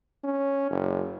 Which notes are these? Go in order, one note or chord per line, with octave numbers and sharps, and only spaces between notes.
C#4
F#1